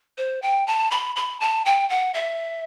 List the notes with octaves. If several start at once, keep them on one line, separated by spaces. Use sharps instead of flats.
C5
G5
A5
B5
B5
A5
G5
F#5
E5